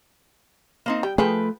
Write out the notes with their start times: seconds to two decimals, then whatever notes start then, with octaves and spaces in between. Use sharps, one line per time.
0.86 A#3 C4 D#4
1.03 G3 G5
1.18 F3 A3 G#4 B4 G5